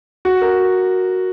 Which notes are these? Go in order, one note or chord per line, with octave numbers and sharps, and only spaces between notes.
F#4
A#4